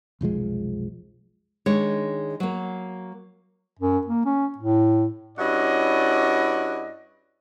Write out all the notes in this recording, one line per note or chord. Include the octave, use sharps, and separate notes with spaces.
F1 B1 F3 G#3
D#3 G#3 D4 C#5
F#3 A#3
F#2
A#3
C#4
A2
G2 C#4 E4 F#4 D5 D#5